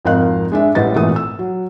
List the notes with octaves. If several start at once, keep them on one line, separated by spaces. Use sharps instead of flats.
G#1 F2 A#4 D#5 F5 F#6
G#3 D4 E5
A1 A2 G3 B4 D#5 A6
G#1 A#2 E3 A3 D#6
E6
F#3